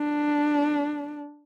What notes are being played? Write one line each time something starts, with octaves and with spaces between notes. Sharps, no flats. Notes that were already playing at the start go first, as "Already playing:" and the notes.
Already playing: D4